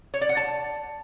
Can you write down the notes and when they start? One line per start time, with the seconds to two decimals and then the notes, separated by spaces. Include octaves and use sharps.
0.14 C#5
0.21 D5
0.29 F#5
0.37 A5